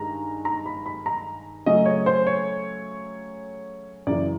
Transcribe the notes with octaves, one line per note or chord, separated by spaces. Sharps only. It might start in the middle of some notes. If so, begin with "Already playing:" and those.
Already playing: G2 D#3 G#3 A#5
A#5
B5
B5
A#5
C#3 F#3 A3 C#4 D#5
C#5
C5
C#5
F#2 C#3 E3 D5